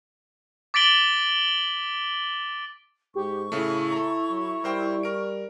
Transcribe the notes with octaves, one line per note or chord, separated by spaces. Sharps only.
D6 A6 B6 D7 F#7 G7
G#2 G4 C#6
A2 C#3 A3 E4
A4 A#5
F#3
G3 A#4 C5 G5
A#4 D7